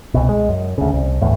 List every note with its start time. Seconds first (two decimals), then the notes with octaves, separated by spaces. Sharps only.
0.14 C2 B2
0.29 G#3
0.49 F#2
0.78 D2 C#3
0.93 C2
1.22 G1 E2 A2